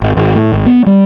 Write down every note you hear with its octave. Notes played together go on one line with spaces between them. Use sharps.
G#1
G#1
A2
G#1
B3
G3